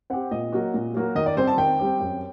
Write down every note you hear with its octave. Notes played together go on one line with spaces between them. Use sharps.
C4 G4 F#5
A#2 D#5
F#3 A#3 F#4
A#2
F#3 A#3 F#4
D#3 D#5
D5
G3 C4 G4 C5
A5
D#3 G5
G3 C4 G4
F#2